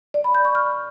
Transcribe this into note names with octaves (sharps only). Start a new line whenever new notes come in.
D5
B5
G6
C#6
F6